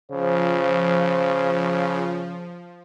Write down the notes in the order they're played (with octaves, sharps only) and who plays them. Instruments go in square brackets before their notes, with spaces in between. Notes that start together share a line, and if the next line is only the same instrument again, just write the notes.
[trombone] C#3 [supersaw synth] F3 [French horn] C5